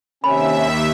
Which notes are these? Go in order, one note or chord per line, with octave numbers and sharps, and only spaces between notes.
D#2 C3 C#4 E5 B5